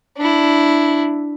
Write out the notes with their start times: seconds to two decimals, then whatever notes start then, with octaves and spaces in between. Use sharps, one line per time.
0.17 D4 E4